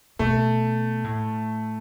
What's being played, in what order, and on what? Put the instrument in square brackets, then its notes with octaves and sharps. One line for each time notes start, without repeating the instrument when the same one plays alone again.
[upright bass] B2 [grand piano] A3
[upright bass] A2